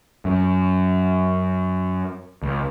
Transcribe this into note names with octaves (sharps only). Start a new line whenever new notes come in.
F#2
C#2